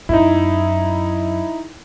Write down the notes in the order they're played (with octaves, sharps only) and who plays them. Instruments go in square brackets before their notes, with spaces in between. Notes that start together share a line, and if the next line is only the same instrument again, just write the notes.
[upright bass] F#2 [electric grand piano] D#4 E4